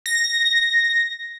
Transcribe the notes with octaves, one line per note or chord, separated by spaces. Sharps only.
A#6